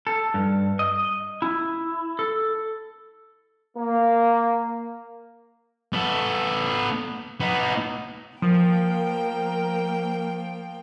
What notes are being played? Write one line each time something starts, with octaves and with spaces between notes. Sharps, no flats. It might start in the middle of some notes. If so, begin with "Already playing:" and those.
A4
G2
D#5
E4
A4
A#3
B3 A4
B3 D#4
F3 A#3 A#4 G5